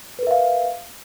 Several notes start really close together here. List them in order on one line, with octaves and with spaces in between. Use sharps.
B4 A#4 E5 F5